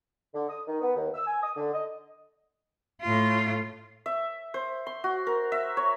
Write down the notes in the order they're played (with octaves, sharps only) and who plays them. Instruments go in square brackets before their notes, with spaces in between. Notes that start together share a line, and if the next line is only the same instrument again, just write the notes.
[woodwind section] D3
D#6
D#3
B3
D#2
E6
G#5
D#6
D3
D#5
[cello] A2 F4
[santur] E5
C5
C6
F#4
A#4
E5
C#5